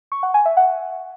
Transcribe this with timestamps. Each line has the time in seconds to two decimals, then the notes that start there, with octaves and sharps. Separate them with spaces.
0.12 C#6
0.23 F#5
0.34 G#5
0.45 E5
0.57 F#5